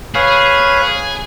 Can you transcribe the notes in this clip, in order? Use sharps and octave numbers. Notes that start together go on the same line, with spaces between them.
G#4 B4 C#5 F5